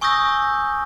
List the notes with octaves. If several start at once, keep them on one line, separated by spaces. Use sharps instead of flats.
G#5 C#6 D#6 E6 G6 A#6